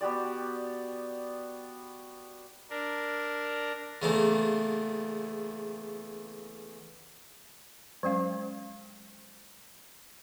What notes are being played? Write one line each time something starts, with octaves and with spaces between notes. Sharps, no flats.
B3 F#4 G4 D5
D4 A#4
E2 C#3 E3 A3 A#3
F#3 G#3 C#4 F5